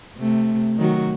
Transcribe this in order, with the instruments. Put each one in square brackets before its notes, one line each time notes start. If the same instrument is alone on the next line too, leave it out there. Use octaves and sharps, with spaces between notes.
[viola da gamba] C3 A3
D#3 F#3 F#4